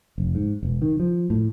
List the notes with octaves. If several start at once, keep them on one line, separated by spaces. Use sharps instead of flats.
F1
G#2
E1
D#3
F3
A2